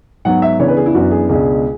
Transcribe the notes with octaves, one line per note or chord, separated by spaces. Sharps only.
G#2 F#3 B3 F#5
E5
C#3 E3 B3 D4 C#5
B4
G#4
E4
F#2 E3 B3 D4 F#4
G#4
C#2 B2 G#3 D4 G#4